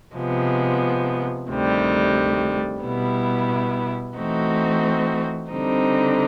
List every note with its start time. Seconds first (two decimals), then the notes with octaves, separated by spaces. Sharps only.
0.15 C3 F3 G#3 B3
1.49 D2 C3 D#3 G3
2.83 B2 G3 B3 E4
4.17 E3 A3 C4 D#4 F#4
5.51 D3 G3 C4 D#4